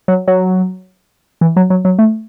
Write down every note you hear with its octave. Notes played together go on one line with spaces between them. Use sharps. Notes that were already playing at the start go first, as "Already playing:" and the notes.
F#3
F#3
E3
F#3
F#3
F#3
A3